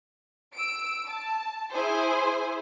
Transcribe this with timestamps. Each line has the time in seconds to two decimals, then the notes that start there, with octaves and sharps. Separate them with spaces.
0.53 E6 D7
1.08 A5
1.72 E4 G#4 C5 G#5